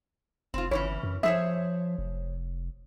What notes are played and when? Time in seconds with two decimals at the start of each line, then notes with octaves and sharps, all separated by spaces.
0.54 F1 C4 F4
0.71 G1 C#3 E3 C#4 C#5
1.03 F#2
1.23 F3 G#4 C5 C#5 E5
1.98 F1